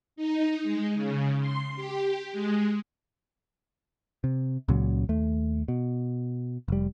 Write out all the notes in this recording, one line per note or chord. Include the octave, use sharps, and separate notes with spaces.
D#4
G#3
C#3
C6
G4
G#3
C3
C#2 A#2 C#3 F#3
D#2 A3
B2
F1 G3